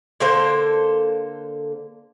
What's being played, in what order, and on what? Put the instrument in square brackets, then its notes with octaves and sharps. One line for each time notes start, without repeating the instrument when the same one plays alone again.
[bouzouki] D3 A#3 A4 C5